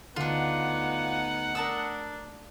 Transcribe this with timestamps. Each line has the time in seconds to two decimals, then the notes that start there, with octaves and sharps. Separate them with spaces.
0.16 D2 D3 B3 D4 D#4 F4 F#5
1.55 D4 A#4 A5 D#6 E6